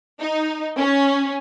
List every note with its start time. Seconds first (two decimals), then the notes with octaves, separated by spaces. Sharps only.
0.19 D#4
0.77 C#4